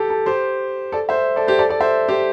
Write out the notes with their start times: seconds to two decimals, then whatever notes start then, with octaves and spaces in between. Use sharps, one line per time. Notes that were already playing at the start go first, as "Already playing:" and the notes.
Already playing: G4 A4
0.10 A4
0.26 G4 C5
0.92 A4 D5
1.09 C5 E5
1.36 A4 D5
1.47 G4 C5
1.59 A4 D5
1.69 A4 D5
1.80 C5 E5
2.08 G4 C5